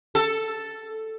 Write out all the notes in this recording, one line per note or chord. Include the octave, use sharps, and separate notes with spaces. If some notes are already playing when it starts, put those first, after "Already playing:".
A4